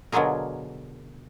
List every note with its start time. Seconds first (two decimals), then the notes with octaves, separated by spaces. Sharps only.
0.12 B2 D3 F#3 F4 G#4 A#4